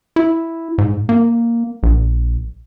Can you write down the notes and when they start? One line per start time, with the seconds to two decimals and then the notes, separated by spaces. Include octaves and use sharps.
0.16 E4
0.78 G#2
1.09 A#3
1.83 A#1